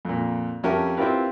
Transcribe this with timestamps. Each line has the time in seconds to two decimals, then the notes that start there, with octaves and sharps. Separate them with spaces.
0.05 F2 A#2
0.63 F2 C#4 G4 A#4 E5 A5
0.97 C4 E4 F4 G4 A#4 B4